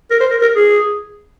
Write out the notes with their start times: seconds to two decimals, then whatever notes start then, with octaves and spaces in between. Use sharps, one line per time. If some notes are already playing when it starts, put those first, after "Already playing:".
0.11 A#4
0.20 C5
0.31 A#4
0.42 A#4
0.56 G#4